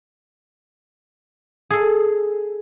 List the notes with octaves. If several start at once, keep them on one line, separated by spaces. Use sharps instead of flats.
G#4 A4